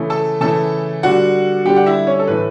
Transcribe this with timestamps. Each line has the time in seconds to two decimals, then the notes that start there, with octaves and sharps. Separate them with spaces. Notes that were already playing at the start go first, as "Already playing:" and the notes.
Already playing: C#3 E3 A3 E4
0.10 A4 A5
0.41 C#3 E3 A3 E4 A4 A5
1.03 D3 G3 D4 F#4 F#5
1.65 D3 G3 D4 G4 G5
1.76 F#5
1.86 E4 E5
2.07 C#4 C#5
2.19 A4
2.27 A2 E3 A3 B4